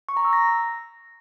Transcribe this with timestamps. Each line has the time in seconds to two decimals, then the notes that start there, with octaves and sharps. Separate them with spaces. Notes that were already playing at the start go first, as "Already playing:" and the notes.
0.09 C#6
0.17 A#5
0.25 E6
0.33 A#6